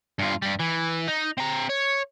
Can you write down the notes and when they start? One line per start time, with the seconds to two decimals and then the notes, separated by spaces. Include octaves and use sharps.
0.19 G2 F4
0.42 G2 G3
0.60 E3
1.08 D#4
1.38 C4 A#5
1.69 C#5